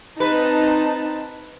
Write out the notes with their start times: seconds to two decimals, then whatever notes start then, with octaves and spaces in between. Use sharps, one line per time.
0.20 C4 D#4 B4 A5